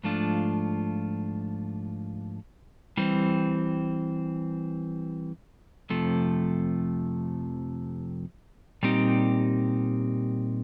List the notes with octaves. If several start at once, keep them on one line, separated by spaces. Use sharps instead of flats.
G#2 F3 A3 D4 F4
E3 G3 C4
F2 C3 F3 A3
A#2 G3 C4 D#4 G4